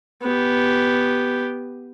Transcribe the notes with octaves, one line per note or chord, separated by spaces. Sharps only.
B3 G4